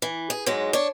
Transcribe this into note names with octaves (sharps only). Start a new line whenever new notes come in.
E3
G#4
G#2 F#3 G#3
D4 C#5